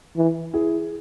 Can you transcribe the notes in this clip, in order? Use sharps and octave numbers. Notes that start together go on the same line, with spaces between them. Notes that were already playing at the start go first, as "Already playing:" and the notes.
E3
E4 G#4